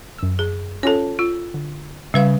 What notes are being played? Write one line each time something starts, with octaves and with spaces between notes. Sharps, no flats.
F#2 E6
G#4
C#4 F4 A4 C#5 A5
F4 E6
D3
C#3 G3 B4 F5